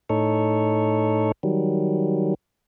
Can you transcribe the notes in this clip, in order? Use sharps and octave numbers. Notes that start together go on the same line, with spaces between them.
A2 D#4 A4 C#5
D#3 F#3 G3